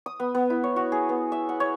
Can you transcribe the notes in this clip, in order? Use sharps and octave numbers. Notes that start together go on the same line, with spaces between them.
D#6
B3
B3
E4
C#5
F#4
G#4
B3
E5
F#5
C#5